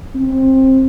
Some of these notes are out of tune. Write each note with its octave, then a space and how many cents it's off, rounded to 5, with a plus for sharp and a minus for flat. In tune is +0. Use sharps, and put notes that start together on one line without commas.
C4 +20